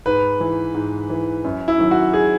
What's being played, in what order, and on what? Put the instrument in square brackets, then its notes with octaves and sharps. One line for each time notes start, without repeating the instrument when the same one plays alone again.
[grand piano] G#2 B4
E3
G#2
E3
F#2
E4
D#3 F#3
F#4
G#4